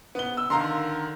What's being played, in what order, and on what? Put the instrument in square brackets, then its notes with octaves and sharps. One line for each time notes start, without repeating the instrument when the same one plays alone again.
[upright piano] B3 G7
E6
[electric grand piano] D3 D#3 [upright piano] F5 A#5 C6